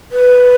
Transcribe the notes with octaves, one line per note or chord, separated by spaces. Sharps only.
B4